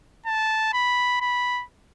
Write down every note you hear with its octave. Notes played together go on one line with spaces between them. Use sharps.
A5
B5
B5